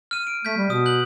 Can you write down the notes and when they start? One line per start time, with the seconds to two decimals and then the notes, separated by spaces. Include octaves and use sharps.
0.11 F6 D#7
0.27 D7
0.45 A3 G6 B6
0.57 G3
0.70 B2 D#6
0.86 F#6 G6 F#7